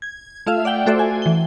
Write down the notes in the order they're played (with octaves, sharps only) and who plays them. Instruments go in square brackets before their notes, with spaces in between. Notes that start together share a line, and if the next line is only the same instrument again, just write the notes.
[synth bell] G#6
A3 F4 E5 F5
D5 F#5 G5
A3 F#4 A4 C5 D5 E5
G#5
E3 G7